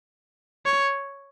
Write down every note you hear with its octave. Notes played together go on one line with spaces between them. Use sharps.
C#5